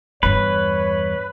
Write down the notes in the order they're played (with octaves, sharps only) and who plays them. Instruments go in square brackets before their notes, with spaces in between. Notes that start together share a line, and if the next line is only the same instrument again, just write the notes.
[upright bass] E2 G2 [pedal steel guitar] B4 [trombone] C#5